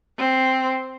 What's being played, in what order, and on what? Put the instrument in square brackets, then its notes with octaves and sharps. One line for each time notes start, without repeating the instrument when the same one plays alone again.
[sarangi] C4